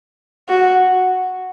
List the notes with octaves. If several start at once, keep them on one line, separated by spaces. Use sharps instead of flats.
F#4